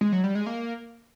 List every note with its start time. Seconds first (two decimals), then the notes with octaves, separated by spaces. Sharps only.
0.01 G#3
0.12 F#3
0.24 G3
0.35 G#3
0.46 A#3